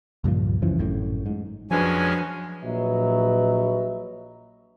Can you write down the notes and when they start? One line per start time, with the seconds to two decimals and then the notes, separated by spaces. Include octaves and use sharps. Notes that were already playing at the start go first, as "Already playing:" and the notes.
0.24 C#2 G2 A#2 F3
0.62 F#2 C#3 E3 F3
0.78 G#1 F#2 A2
1.26 G#2
1.71 F2 F3 F#3 G#3 C#4 D4 B4 G#5
2.63 A#1 A#2 F#3 B4 D#5 E5